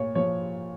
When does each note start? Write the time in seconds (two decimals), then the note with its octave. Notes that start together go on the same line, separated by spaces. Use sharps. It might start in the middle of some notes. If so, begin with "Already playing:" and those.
Already playing: A#2 C#5
0.15 F3 C#5